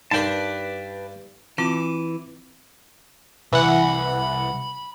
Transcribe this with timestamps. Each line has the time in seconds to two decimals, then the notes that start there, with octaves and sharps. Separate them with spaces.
0.11 G2 D4 D#4 A#4 B4 D5 G5 A5
1.58 E3 C4 F4 D6
3.53 C2 E3 F#5 B5